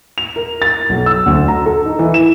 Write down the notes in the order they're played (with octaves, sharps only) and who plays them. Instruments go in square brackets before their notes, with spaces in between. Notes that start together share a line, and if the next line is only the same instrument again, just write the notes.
[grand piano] F7
A#4
A6
B1
E6
D2
A#5
A4
D#4
E3
E7